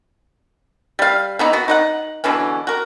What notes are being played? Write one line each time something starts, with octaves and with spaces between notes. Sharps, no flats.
G3 F5
E3 B3 D#4
B3 F#4
D#4 D#5 F#5
B2 D3 E3 C#4
F#4 A#4